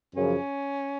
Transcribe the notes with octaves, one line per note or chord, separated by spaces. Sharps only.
F#2 C#3 F3 C#4